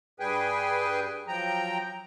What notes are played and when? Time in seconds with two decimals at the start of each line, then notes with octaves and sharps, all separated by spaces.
0.20 G2 G3 G#4 B4 G5 G#5
1.28 F3 F#3 G5 A#5